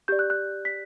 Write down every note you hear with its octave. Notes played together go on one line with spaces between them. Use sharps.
G4 D5 G6
F#6
F#6
B6